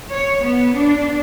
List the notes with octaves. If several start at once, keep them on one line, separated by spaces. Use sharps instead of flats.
C#5
B3
D4